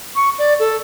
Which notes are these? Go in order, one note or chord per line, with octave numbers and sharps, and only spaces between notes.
C#6
D5
A4